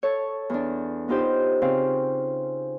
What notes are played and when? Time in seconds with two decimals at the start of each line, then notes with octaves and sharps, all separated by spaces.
0.03 A4 C#5
0.50 E2 D4
1.08 B3 D#4 F4 G4 C5
1.62 C#3 C4 F5